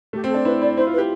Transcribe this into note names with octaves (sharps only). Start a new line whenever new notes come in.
A3 G4
C4
A4
D4
E4 B4
E4 D5
E4 C5
F4
B4
G4